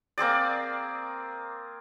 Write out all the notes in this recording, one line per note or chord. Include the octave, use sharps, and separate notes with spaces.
A#3 C4 G#4 D5